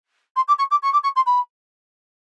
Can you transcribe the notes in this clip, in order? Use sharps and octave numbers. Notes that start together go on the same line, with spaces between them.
C6
D6
C#6
D6
C#6
D6
C#6
C6
B5